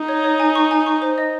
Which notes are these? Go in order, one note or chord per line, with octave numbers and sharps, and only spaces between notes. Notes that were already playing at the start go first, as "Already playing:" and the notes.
Already playing: D#4
C#5
C#5
G#5
C#6
G#5
C#6
C5
D#5